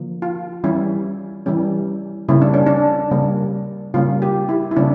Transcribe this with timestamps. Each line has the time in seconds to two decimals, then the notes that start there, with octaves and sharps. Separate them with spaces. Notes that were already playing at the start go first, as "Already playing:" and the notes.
Already playing: D3 F3 A#3
0.22 F4
0.64 E3 G3 C#4 E4
1.46 E3 G3 C#4
2.29 C#3 G3 A#3 C#4 E4
2.42 D4
2.54 C#4
2.67 D4
3.11 C#3 G3 A#3 C#4
3.94 C#3 G3 A#3 C#4 F4
4.22 G4
4.49 E4
4.71 E4
4.76 C#3 G3 A#3 C#4 D4